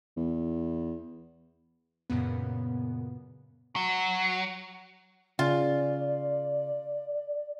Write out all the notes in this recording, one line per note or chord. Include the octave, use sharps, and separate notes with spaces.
E2
F#2 A#2 C#3 B3
F#3
C#3 F4 D5